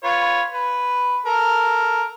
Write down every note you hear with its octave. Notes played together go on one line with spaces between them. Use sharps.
F4 B4 C#5
B4
A4 A#4